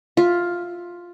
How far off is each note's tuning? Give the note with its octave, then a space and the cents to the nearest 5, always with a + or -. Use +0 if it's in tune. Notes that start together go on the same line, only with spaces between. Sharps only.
F4 +5 E5 -5